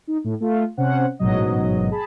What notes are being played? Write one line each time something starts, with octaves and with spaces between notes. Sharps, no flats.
D#4
A2
A3 F4
C3 C#4 C5 F#5
A1 G#2 B2 F#3 D#5
G#4 A5 B5